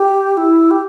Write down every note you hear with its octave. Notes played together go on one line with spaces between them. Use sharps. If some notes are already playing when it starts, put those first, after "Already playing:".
Already playing: G4
E4
G4